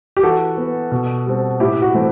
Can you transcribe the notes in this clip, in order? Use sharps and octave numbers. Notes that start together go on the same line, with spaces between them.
G4
E3 F#4 A4
B3
B2
G3 C4
A2 E4 G4
F#4
E3 A3 C4